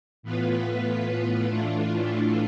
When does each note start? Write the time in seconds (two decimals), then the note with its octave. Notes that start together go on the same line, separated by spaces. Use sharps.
0.23 A2 E3 B3 F4 B4
1.48 A2 E3 A3 D4 F4